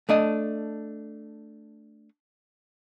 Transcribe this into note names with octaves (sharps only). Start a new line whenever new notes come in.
A3 D4 D#5